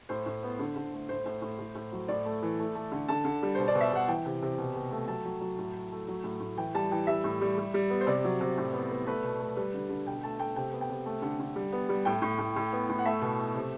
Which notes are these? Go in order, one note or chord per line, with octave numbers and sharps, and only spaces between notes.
A2 C5
A2
B3
D3
D3
A3
A2 C5
A2
A2
A2
A2
F#3
A2 D5
A3
E3
A3
A3
D3
D3 A5
D3
G3
B2 C5
D5
B2
E5
B2 F#5
E3 G5
C3
C3
B2
B2
A3
F#3 A5
F#3
F#3
A2
A3
A3
F#3
A2
A2
E3 G5
G3 A5
E3 G5
G3 E5
A2
G3
G3
G3
B3
C5
C3 D5
F#3
C3
A2
B3
B3
A3 B4
B2
A3
G3 B4
D3
D3
B2 G5
A3 A5
A3 G5
C3 G5
B3
G5
C3
A3
D3
D3
G3
B3
G3
A2 G5
A2
A2
A2
B3
A2
F#5
A3 E5
B2
A3
C3